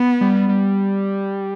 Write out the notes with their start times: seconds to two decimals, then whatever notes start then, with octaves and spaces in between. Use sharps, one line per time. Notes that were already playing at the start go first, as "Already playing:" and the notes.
Already playing: B3
0.21 G3
0.49 G3